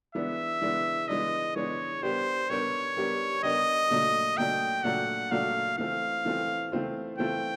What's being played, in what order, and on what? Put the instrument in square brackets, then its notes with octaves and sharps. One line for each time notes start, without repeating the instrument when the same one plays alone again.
[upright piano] E3 G#3 B3 D4 [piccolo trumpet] E5
[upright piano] E3 G#3 B3 D4
[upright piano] E3 G#3 B3 D4 [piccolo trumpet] D#5
[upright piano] E3 G#3 B3 D4 [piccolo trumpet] C#5
[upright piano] G3 B3 D4 G4 A#4 [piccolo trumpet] C5
[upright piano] G3 B3 D4 G4 A#4 [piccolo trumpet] C#5
[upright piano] G3 B3 D4 G4 A#4
[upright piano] G3 B3 D4 G4 A#4 [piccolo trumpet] D#5
[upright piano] A#2 F#3 A3 D4
[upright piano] A#2 F#3 A3 D4 [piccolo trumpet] G5
[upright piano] A#2 F#3 A3 D4 [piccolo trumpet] F#5
[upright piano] A#2 F#3 A3 D4 [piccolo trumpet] F5
[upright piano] E3 A3 C4 F4 [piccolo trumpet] F5
[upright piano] E3 A3 C4 F4
E3 A3 C4 F4
[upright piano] E3 A3 C4 F4 [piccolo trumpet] G5